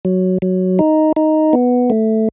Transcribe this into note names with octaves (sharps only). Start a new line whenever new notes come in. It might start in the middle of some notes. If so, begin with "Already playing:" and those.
F#3
F#3
D#4
D#4
B3
A3